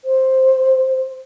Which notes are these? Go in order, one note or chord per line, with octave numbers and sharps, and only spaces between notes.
C5